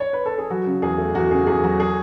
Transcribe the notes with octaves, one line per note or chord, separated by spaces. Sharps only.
C#5
B4
A4
G#4
F#3 F#4
C#3
E2 G#4
A3
E2 F#4
C#3 G#4
E2 G#4
F#3 F#4
G#4